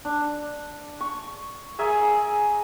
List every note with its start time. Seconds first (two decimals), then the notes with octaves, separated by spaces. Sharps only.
0.05 D4
1.00 C#6
1.79 G#4 A#4 E5 G#5